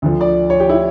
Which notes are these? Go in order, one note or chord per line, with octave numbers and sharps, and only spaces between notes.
D2 D3 F3
D5
C#5
G4
E4